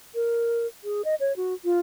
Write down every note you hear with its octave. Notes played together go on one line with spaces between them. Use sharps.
A#4
G#4
D#5
C#5
F#4
F4